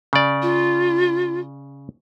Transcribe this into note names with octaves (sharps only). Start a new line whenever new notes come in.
C#3 D5
F4